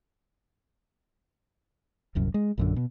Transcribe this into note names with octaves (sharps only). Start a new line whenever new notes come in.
D#1 C2 F#2
G#3
A#1 F#2 D3
B2